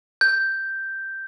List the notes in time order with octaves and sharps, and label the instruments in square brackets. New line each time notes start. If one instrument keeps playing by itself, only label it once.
[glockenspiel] G6